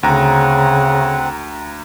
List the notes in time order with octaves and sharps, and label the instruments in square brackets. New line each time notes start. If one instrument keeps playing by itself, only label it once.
[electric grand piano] D2 A#5 [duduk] C#3 [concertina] C4 F#5